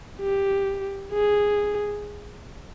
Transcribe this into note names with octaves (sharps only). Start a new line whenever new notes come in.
G4
G#4